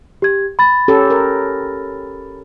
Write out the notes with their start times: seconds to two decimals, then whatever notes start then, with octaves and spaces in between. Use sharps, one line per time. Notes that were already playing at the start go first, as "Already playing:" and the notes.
0.22 G4 G#6
0.59 B5 A6
0.88 C#4 G4 A4
1.10 A#4